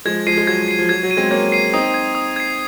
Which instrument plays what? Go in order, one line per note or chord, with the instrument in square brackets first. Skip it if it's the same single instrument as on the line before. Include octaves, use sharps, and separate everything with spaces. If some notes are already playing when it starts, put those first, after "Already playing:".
[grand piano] F3 G#3 [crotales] G#6
[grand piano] F3 G#3 [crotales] C7 D#7
[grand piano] G#3
[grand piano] F#3 [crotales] G#6
[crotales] C7 D#7
[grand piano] F3
[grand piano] F#3 [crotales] G#6
[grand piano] F#3
[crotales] C7 D#7
[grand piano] G#3 C4
[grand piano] A#3 C#4 [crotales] G#6
[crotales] C7 D#7
[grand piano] C4 D#4 [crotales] D#6
[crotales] G#6 C7
D#6
G#6 C7